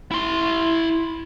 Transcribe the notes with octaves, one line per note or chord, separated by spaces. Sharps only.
E4 C6